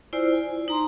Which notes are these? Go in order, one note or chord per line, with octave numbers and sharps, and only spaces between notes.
E4 F4 C5 D5 G#5
G#5
D#4 A#5 C6